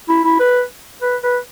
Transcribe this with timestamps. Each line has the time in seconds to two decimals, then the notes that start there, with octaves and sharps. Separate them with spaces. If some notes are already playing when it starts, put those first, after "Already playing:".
0.09 E4
0.25 E4
0.40 B4
1.02 B4
1.23 B4